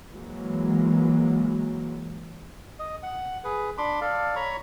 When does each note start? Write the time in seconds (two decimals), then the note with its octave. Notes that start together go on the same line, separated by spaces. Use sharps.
0.12 E3 F#3 G#3 A#3
2.79 D#5
3.03 F#5
3.44 G#4 B4
3.78 D4 B5 C6 D6
4.01 A4 D5 F5
4.36 C#5 A#5 B5 C#6